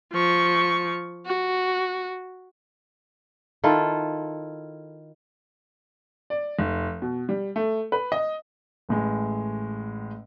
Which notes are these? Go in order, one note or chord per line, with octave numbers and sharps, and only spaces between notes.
F3 C#6
F#4
D#3 E4 F4 A4
D5
F1
B2
G3
A3
B4
D#5
A1 A2 G#3